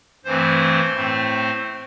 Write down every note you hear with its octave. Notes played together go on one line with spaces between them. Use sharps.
G2 E3 A3 C4 C5
A2 A3 C4